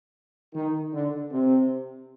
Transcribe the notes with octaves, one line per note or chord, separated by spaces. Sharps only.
D#3 D#4
D3 D4
C3 C4